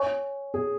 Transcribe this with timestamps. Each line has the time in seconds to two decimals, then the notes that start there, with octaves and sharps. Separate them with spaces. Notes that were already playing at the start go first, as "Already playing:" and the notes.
Already playing: C#5 G#5 C#6
0.54 G#4